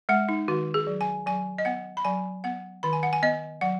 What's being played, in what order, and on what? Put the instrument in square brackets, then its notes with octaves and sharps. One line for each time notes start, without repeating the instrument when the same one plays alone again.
[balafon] G#3 F#5
D#4
D#3 F#4
G#4
F#3
G#5
F#3 G#5
D#5
B3 F#5
B5
F#3 G#5
B3 F#5
D#3 B5
G#5
F#5
G#5
B3 D#5
F#3 F#5